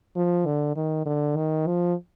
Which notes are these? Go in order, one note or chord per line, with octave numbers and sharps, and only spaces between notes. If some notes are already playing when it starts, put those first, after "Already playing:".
F3
D3
D#3
D3
D#3
F3